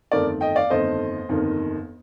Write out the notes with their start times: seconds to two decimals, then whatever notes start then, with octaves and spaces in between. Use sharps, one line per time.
0.12 G1 F2 D#3 A3 A#4 D5
0.41 D#5 G5
0.56 D5 F5
0.70 G1 F2 D#3 A3 C5 D#5
1.29 G1 F2 D#3 A#3 D#4